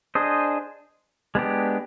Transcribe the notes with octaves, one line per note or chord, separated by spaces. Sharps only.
D4 G#4 C5 D#5
G#3 B3 D4 G4